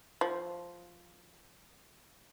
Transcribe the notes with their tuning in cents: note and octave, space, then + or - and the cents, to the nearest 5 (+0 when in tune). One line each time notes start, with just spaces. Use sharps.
F3 +0